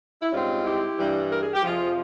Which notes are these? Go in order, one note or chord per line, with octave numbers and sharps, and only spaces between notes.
E4
G#2 G3 C4 C#4 F4
E4 G4
G2 E3 G3
A#4
G#4
G4
F2 C3 F3 F4 G#4